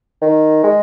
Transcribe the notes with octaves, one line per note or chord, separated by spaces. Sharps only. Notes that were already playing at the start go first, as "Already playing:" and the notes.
D#3
G#3